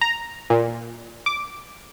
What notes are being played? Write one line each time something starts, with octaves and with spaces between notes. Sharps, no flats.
A#5
A#2
D6